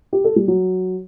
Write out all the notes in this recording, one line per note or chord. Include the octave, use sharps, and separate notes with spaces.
G4
A4
G3
F#3